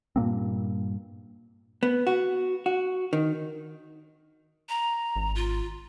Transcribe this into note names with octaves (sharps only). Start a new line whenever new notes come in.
G2 A#2 A#3 C4
B3
F#4
F#4
D#3
A#5
G#1
F4